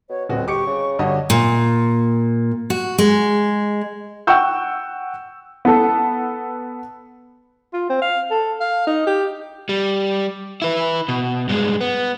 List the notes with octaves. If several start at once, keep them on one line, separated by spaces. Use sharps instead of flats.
B2 C#5
D#1 B2 C4 F#4 D#5
G4 C#6 D6 C#7
C#3
G2 D3 F#4 C#5 D#5
A#2
F#4
G#3
F#5 G5 C#6 E6 G6
B3 A4
F4
C4
F5
A4
F5
D#4
G4
G3
E4 B4
B2
G2 G#3
B3